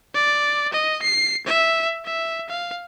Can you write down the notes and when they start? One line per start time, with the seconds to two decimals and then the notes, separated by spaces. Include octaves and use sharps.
0.15 D5
0.73 D#5
1.02 C7
1.46 E5
2.05 E5
2.49 F5